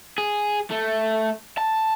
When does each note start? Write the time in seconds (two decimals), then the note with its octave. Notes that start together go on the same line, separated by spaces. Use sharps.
0.18 G#4
0.71 A3
1.58 A5